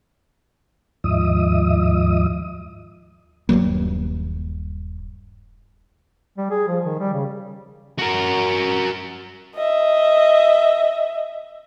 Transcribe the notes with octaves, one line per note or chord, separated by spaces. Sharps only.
D#2 G#2 F3 D#5 E5 D#6
D#1 G2 F#3 A#3
G3
G#4
F3
D#3
G3
C#3
F#4 A#4
D#5 E5